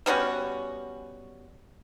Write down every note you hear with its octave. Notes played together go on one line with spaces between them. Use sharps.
G3 B3 C#4 F#4